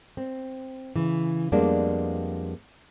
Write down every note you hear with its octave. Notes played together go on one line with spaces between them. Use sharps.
C4
C#3 E3
F2 G3 G#3 A#3 B3 D4